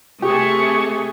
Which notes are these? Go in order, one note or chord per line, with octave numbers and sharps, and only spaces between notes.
C3 A3 G4 G#4 C#6